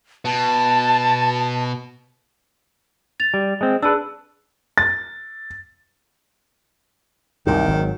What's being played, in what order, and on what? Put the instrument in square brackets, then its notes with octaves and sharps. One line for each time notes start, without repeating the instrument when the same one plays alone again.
[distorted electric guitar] B2 [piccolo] A5
[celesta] A6 F7
[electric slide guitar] G3
G#3 C4
[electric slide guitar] D4 B4 [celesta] G#4 A5 E6
[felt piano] A6
[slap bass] C2 F#2 A#2 [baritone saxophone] D#3
[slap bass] G#1 D3 F#3